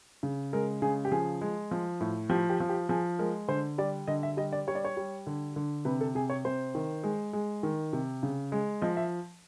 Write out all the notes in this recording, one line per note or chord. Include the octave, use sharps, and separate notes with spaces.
C#3
G#3 A#4
C#3 G#4
G4
F3 G#4
G#3
F3
A2
F3 G4
G4
F3
G4
F3 G#4
G#3 A#4
D3 C5
G3 D5
D3 D#5
E5
G3 D#5
D5
G3 C#5
D5
C#5
G3
D3
D3
C3 B4
A4
C3 G#4
C#5
C3 C5
D#3
G#3
G#3
D#3
C3
C#3
G#3
F3 D#5
E5